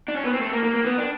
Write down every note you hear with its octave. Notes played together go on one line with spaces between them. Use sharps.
D4
C#4
B3
C4
A3
A#3
A#3
A#3
B3
D4